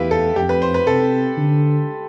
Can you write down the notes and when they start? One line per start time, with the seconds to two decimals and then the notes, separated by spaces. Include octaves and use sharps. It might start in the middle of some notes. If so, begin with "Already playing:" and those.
Already playing: E2 E4 F4 G4 B4
0.11 A4
0.36 F2 G4
0.49 B4
0.62 C5
0.74 B4
0.87 C3 A4
1.37 D3